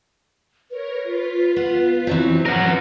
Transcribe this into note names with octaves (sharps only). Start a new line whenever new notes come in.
A#4 B4 C#5
F4 B6
B3
E3 F#3 C4
G#2 F3 C#4 A#4 B4 F#5